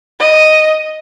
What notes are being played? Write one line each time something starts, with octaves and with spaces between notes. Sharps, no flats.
D#5